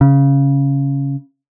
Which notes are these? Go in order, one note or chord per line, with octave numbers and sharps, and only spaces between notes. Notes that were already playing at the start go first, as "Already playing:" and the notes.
C#3